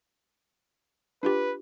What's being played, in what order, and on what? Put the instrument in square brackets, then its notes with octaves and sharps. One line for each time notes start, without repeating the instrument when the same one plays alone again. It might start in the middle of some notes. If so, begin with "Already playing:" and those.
[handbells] D4 F4 G4 [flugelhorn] B4